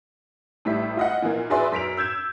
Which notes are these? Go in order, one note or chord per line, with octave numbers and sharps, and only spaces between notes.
A1 A2 G3 E5 B6
F4 D#5 F#5
A#2 E3 A#3
F#4 G#4 B4 D5 E5 C6
F#2 B6 D7 F7
E6 G6 G#6 E7